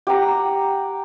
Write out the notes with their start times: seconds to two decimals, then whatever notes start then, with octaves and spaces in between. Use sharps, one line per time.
0.07 G4 F#5 A#5